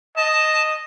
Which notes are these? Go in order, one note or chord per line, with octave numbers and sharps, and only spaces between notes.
D#5 A5